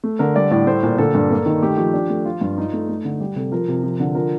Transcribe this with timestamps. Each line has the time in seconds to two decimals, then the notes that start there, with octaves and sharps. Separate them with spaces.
0.04 A3
0.19 D3 A#4
0.36 G3 D5
0.51 A2 D5
0.67 A3 C5
0.83 A#2
0.98 D3 A4
1.15 G2
1.30 A#3
1.46 D#3
1.62 A3 G4
1.78 F3 G4
1.94 D4
2.10 A3
2.25 F3 F4
2.41 G2
2.58 D#4
2.73 A3
2.89 A3
3.05 D3
3.20 G3 G4
3.36 C3 A4
3.52 F3 A#4
3.68 C3
3.83 F3
4.00 D3
4.15 F3 A#4